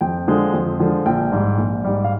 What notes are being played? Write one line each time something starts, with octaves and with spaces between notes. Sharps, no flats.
F2 G5
D3 F3 G#3
F2
D3 F3 G#3
A#1 G5
G#2 G3
A#1
G#2 G3
F5